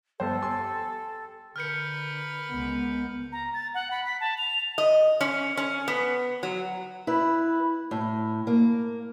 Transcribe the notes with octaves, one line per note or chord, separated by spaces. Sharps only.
G1 G3 A4 C5 G5
G4 G#5 C6
D3 A#4 B4 F6 G6 C#7
C#2 G#3 B3
A#5
A6
F#5
B5
B6
A5
F7
D#5
C#4
C#4
B3
F#3
E4 B4
A2
A#3